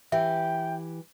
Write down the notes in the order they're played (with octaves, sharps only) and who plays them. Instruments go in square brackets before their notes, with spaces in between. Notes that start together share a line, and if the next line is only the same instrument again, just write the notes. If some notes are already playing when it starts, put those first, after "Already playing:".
[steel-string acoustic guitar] E3 G4 [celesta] E5 [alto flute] G5